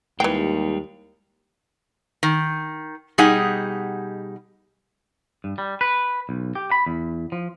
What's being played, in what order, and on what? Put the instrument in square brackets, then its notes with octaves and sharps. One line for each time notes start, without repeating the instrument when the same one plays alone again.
[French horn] D#2 [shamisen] E3 G5 [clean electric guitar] G3 G#3
[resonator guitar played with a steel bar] D#3
B2 G3 D#4 G#4 F#5 G#5
[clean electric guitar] G2
G3
B4
B1
G4
B5
E2
F3